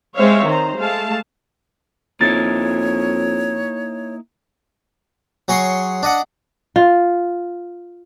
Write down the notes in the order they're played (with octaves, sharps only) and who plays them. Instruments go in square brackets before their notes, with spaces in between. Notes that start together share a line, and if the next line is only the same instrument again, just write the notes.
[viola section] G#3 C4 C5 C#5 E5 F5
D#3 C5 A#5
G#3 A3 F5 A5
[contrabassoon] F2 [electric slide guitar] A#3 D#4 E4 [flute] C#5 [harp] A6
[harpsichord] F#3 G#4 C#5 C6 C#6
D4 D#5 F#5
[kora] F4